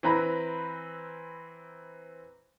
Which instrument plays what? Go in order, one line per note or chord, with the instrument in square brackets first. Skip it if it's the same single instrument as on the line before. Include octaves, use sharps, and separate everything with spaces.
[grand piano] E3 C4 B4 A#5 B5